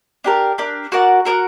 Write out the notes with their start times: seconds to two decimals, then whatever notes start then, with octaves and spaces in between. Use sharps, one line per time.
0.24 D4 G4 A#4
0.58 D4 G4 A#4
0.92 F#4 A#4 D5 F#5
1.25 F#4 A#4 D5 F#5